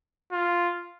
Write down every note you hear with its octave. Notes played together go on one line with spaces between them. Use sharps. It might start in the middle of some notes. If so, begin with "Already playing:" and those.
F4